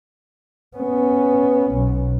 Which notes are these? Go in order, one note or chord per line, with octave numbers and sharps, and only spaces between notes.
B3 C#4
B1